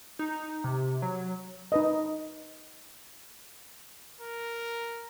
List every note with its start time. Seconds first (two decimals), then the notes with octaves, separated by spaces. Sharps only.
0.19 D#4
0.64 C3
1.02 F#3
1.72 D#4 B4 D#5
4.21 A#4